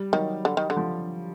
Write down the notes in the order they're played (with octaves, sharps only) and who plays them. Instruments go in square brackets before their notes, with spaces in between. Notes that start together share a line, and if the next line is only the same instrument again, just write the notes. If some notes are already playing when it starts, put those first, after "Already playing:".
Already playing: [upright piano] G3
[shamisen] D#3 [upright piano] F#3
[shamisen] D3
D#3
D3
[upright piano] F3